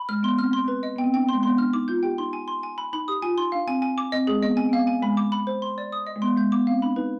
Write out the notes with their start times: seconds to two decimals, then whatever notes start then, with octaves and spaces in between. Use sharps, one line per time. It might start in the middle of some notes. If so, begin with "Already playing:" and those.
Already playing: B5
0.09 G#3 F6
0.23 B3 C6
0.38 C4 F6
0.53 C6
0.68 B4
0.83 D#5
0.96 B3 G5
1.04 C4
1.14 D4 G5
1.23 B3
1.29 G#3 C6
1.43 B3 C6
1.58 D4 F6
1.73 D#4 D6
1.88 F4 G6
2.03 G4 G5
2.18 D#4 C6
2.33 G#5
2.48 C6
2.63 G#5
2.78 B5
2.93 D#4 B5
3.08 G4 D#6
3.22 F4 G#5
3.37 D#4 C6
3.52 D4 F5
3.67 C4 G#5
3.82 G#5
3.98 D6
4.12 C4 D#5
4.27 G#3 G#4
4.42 B3 D#5
4.55 C4 G#5
4.69 B3 F5
4.87 G#5
5.02 G#3 B5
5.17 D6
5.32 B5
5.47 C5
5.62 C6
5.78 D5
5.92 D#6
6.07 D#5
6.16 G#3
6.22 B3 C6
6.37 G#3 G6
6.52 B3 D6
6.67 C4 F5
6.82 D4 B5
6.96 D#4 B4